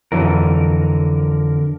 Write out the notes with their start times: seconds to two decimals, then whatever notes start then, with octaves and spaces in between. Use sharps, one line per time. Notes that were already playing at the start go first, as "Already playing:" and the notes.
0.12 F2 D3 E3 F#3 A#4